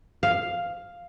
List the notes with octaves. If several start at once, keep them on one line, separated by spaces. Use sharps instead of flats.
F5